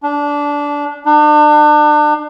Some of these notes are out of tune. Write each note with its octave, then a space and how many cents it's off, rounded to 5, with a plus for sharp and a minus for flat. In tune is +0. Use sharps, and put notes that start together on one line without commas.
D4 -15
D4 +35